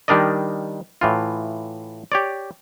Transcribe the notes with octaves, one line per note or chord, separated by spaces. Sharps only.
D#3 G3 D4 A#4 D5 D#5
A2 E3 F4
G4 C#5 D5